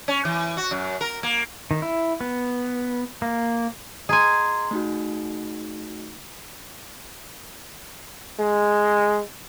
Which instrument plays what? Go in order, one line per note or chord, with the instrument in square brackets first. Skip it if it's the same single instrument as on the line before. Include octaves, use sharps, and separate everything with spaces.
[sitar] C#4
E3
F#4
F#2
A#4
A#3
[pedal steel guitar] D#3
E4
B3
A#3
[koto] G#4 G#5 [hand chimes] D#5 A#5 C6
[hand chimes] A3 D#4 F#4
[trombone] G#3